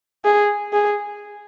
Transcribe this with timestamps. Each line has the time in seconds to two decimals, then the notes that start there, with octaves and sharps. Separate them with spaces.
0.25 G#4
0.73 G#4